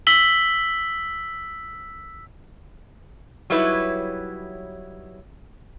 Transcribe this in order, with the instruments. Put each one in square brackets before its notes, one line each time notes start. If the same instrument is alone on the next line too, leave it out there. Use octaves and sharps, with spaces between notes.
[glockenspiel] E6 B6 F#7 G7
[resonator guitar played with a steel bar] F#3 G3 D#4 E4 B4 C#5